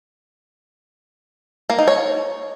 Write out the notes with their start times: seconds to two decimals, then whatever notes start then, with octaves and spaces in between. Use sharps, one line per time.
1.70 A#3
1.79 D#4
1.88 C#5